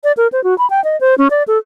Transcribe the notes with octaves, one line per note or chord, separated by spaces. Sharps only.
D5
A#4
C5
F#4
B5
G5
D#5
C5
C#4
D5
A4